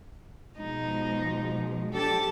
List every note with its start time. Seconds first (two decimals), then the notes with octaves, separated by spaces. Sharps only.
0.57 B2 F3 G#3 D#4
1.93 F3 D4 G4 A4 A5